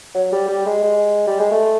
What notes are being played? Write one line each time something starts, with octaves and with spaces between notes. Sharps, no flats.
F#3
G3
G3
G#3
G#3
G3
G#3
A3